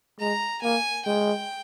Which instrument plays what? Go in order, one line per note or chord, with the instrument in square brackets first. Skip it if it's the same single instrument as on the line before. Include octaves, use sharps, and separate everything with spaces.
[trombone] G#3 [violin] A#5
[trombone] A#3 [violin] G#5
[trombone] G#3 [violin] G5